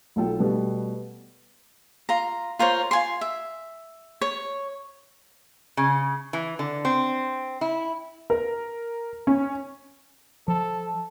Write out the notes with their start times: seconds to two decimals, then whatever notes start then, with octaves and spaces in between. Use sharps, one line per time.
0.16 B1 F4 A4 G5
0.39 B2 G3 A3 B3
2.09 F4 A#5
2.59 F4 A#4 C5 C#5
2.91 F4 G#5 C6
3.21 E5
4.21 C#5
5.77 C#3
6.33 E3
6.59 D3
6.85 C4
7.61 E4
8.30 A#4
9.27 C#4
10.48 F3 A4